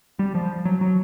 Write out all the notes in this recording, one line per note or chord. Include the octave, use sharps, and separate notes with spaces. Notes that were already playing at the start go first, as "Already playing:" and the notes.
G3
F3
F#3
F#3